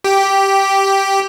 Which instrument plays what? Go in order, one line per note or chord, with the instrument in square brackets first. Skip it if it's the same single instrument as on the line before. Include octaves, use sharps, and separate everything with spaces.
[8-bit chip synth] G4